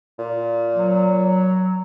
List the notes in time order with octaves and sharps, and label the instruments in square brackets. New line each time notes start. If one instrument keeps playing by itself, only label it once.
[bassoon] A#2
[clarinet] F#3